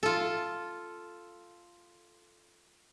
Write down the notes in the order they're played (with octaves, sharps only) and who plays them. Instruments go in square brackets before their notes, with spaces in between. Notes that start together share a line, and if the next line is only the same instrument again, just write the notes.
[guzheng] F4 A4